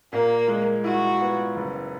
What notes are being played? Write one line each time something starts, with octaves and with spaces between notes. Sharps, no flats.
A#2 A#3
G#3
E4 F#4
B3
F#1